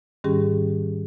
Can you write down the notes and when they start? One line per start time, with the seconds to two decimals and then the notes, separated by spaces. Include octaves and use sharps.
0.24 G#2 D#3 G3 C#4 G4 G#4